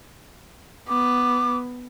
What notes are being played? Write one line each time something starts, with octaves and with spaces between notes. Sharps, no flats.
B3 D6